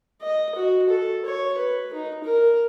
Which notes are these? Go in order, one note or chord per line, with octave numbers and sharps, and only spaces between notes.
D#5
F#4
A4
C#5
B4
D#4
A#4